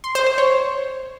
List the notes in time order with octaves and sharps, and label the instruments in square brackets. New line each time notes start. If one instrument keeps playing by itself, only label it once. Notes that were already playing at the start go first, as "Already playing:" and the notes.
[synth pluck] C6
C5
C5
C#5